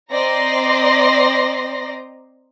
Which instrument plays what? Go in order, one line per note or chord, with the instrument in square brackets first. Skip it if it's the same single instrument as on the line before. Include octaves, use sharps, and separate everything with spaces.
[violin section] C4 D5 D#5 A#5 C6 A#6